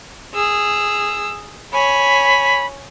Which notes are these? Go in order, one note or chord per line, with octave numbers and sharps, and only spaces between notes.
G#4 E6
C#5 G#5 B5